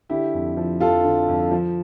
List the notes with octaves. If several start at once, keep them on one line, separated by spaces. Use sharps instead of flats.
D3 E4 G4
F2
F3
F2 F4 A4
D3
F2
F3